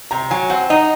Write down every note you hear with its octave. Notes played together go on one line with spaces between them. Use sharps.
C3 A#5
F#3 G#5
C4 F#5
D#4 D#5